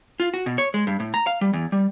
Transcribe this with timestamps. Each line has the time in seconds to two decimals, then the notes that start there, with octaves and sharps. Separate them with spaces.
0.20 F4
0.34 F#4
0.46 B2
0.58 C#5
0.74 G#3
0.87 G2
1.00 A2
1.14 A#5
1.27 F5
1.41 G3
1.53 E2
1.72 G3